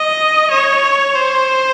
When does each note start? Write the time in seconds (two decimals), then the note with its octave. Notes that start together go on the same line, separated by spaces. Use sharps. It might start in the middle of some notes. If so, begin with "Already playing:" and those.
Already playing: D#5
0.51 C#5
1.15 C5